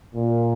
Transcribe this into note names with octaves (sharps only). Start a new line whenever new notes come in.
A#2